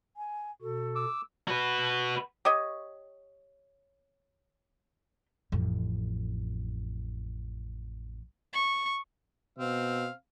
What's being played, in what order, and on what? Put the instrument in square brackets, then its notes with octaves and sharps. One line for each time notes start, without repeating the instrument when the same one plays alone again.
[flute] G#5
[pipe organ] B2 F#4 [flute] A4
[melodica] D6 E6
[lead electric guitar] F#4 B4
[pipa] G4 C#5 D#5
[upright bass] A1 F2
[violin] C#6
[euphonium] B2 [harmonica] C4 F5